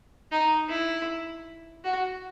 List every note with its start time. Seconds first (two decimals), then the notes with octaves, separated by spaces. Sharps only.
0.31 D#4
0.69 E4
1.84 F#4